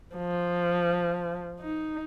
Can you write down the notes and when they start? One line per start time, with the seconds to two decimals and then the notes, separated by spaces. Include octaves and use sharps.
0.16 F3
1.60 D#4